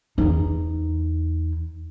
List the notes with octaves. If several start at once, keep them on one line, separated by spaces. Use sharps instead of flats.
E2 D#4